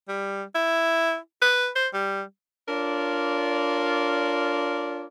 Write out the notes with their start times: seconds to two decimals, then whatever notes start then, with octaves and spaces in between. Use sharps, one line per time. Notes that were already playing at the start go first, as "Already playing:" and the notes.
0.08 G3
0.55 E4
1.42 B4
1.75 C5
1.93 G3
2.68 D4 F4 A#4 C#5 D5